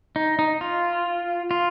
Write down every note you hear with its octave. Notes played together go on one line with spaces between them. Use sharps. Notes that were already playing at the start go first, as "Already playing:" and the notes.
D#4
D#4
F4
F4